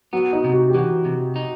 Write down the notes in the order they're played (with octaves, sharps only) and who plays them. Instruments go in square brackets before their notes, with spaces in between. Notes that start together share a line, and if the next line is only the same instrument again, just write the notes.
[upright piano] F#3 [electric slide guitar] B3
[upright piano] D#4
[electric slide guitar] C3
[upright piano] F#4
G4
[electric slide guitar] E3 [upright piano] F#4
[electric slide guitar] C3
D#4